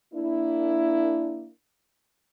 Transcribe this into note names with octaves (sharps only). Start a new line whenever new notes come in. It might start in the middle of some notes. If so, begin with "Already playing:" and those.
A#3 D4 E4